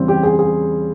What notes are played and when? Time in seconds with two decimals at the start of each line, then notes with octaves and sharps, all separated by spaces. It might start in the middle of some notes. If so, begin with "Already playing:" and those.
Already playing: E2 C#3 G3 C4
0.08 G4
0.23 G#4
0.39 G#4